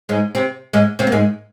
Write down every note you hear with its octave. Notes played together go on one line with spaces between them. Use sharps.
G#2 G#3
C3 C4
G#2 G#3
C3 C4
A#3
G#2 G#3